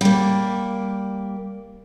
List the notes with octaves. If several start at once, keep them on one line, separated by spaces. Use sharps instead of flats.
G3 A#3